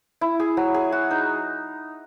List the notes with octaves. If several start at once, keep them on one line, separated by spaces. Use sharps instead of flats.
E4
G#4
F#3
G#4
F#4
D#4